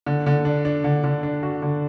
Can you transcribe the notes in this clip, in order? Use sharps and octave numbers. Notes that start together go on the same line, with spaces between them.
D3
D3
D4
D4
D3
D3
D4
F#4
D3